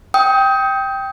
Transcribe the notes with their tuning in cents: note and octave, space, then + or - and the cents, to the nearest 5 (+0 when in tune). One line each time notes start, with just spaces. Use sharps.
G5 +0 D#6 +30